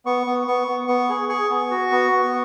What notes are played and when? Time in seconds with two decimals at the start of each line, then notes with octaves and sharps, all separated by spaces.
0.05 B3 C#6
0.27 B3
0.47 B3 C#6
0.68 B3
0.87 B3 C#6
1.09 G#4
1.29 G#4 C#6
1.50 B3
1.70 F#4
1.91 B3
2.11 B3